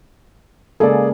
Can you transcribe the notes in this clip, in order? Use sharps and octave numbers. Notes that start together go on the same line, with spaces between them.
C#3 G#3 A#3 G#4 A4 D5